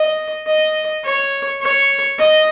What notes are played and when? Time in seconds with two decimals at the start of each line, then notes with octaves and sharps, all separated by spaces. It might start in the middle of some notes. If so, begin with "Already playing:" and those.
Already playing: D#5
0.47 D#5
1.04 C#5
1.61 C#5
2.18 D#5